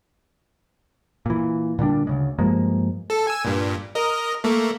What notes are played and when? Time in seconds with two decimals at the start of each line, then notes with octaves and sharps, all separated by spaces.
1.26 A#2 E3
1.79 A#2 D3 G3 D4
2.07 D2 C#3 G#3
2.39 G2 F3 G#3 A#3
3.10 A4
3.27 G#5 E6
3.45 G2 A#2
3.95 A#4 D#5
4.44 A3 A#3